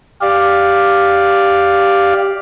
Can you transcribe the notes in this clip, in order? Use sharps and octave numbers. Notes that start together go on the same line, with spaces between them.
G4 D5 F5